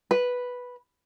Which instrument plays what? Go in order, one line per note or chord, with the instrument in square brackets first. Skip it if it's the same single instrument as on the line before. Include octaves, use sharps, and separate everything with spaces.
[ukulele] B4